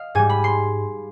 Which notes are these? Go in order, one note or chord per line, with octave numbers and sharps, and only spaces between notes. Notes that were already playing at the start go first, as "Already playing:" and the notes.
Already playing: D#5 F5
G#2 G3 G#5
B5
C6